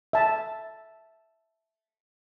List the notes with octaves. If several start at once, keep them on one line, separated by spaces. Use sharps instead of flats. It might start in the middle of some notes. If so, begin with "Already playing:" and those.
E5 A5